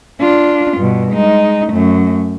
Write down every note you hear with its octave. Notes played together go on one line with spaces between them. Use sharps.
D4 F4
G2 B2
G#3 D#4
F#2 A3